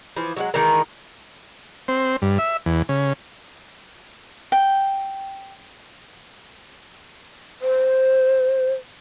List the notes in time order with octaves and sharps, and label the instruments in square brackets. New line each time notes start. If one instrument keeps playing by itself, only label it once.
[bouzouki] E3 F3
F#3 G#3 F#5
D#3 E3 G#3 A#4
[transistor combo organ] C4
G2
E5
E2
C#3
[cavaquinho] G5
[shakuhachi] C5